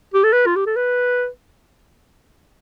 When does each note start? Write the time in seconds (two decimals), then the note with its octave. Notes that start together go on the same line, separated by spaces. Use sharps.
0.14 G4
0.24 A4
0.32 B4
0.46 F4
0.56 G4
0.66 A4
0.76 B4